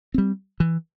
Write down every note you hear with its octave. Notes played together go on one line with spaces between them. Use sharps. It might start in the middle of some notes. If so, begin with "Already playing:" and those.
G3 C4
E3